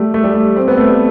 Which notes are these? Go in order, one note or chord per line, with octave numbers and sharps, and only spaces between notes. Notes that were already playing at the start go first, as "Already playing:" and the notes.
Already playing: G3 A3
A3
G3
A3
C4
B3
A3
G3